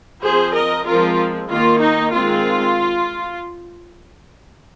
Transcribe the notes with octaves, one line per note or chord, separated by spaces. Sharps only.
F3 C4 G#4 C5
A#4 D#5
F3 G#3 C4 F4 A#4
D#3 A#3 F4
D#4
D#3 G#3 C4 F4